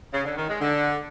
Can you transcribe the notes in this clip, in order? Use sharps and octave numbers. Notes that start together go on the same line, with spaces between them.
C#3
D3
D#3
G#3
D3